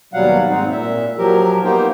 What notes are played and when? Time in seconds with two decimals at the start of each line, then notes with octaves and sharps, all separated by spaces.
0.14 D#2 B2 F#3 G3 F5 F#5
0.49 G#2 C4 D#4
0.71 A#2 E5
1.18 F3 F#3 G4 A#4
1.64 A#3 B3 D#4 G4 C5 G5